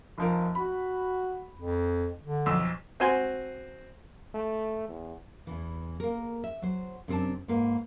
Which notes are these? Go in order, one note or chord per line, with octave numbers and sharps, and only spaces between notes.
F1 F3 A#4
F#4 B5
F2
D3
B1 F2 E6
C4 F#4 G#5 C6
A3
E2
E2 G2 E3
A#3 A#4
E5
F#3 C5
F#2 C3 C4 D4 A5
G#2 A#3 B4